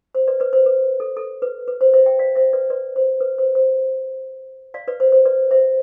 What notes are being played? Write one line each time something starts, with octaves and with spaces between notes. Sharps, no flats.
C5
B4 D5
B4 D5
C5
B4
A4
A4
B4
B4
C5
C5 E5
E5 G5
D5 F5
C5 E5
B4 D5
B4 D5
C5
B4
C5
C5
D5 F5
B4 D5
C5
C5
B4 D5
C5 E5